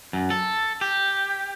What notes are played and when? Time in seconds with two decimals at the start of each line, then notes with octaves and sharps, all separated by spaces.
0.13 F#2
0.30 A4
0.81 G4